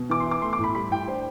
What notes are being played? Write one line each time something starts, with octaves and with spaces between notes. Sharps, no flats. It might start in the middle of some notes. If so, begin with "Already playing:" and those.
Already playing: B2
E3 D6
C6
E4
D6
A3 C6
D6
A2
B5
G3 B5
A2 G5
D4 C5